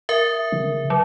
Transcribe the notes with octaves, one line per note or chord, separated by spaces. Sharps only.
A#4 E5
C#3
F#3